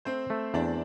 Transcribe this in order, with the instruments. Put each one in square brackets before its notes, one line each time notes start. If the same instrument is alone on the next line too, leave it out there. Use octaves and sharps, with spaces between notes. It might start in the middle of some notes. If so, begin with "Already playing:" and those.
[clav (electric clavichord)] A3 [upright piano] C4 C5
[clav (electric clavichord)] A3
[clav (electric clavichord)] E2 [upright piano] D4 D5